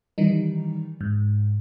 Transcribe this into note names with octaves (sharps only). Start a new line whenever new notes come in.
D#3 E3 G3 D#4
G#2